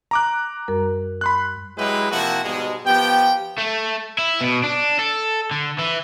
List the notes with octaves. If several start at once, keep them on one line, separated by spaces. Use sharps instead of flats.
A#5 D6 F#6
F#2 G3 A#4
B5 C6 F#6
F#3 G#3 E4 G4 B4
C3 F3 A#3 E4 F#4
G#2 B2 G3 G#3
F3 B3 G4 G5
A3
E4
B2
D4
A4
D3
E3